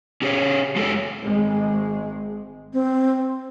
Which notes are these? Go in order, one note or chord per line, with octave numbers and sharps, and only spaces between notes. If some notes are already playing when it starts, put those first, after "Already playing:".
C#4 G4 G#4 C#5
G#3 F#4 G#4 A4 C#5
G#1 G#3
C4